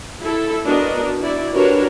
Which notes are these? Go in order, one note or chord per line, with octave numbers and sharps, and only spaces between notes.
E4 A4
B3 D4 F#4 A#4 D#5
E4 F#4 D5
D4 F#4 G4 A#4 B4 C#5